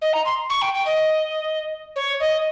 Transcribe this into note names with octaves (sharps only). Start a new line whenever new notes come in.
D#5
A#5
C6
C#6
G5
G5
D#5
C#5
D#5